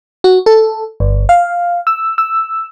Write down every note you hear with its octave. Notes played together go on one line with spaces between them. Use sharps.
F#4
A4
G1
F5
E6
E6